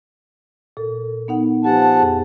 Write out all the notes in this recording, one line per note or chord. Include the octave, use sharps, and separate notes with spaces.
A#2 A4
B3 D#4 F#5
F3 G4 B4 F#5 G#5 A5
F2 G#4